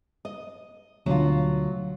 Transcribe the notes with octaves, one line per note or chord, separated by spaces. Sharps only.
D#5
D2 B2 F#3 D4 F4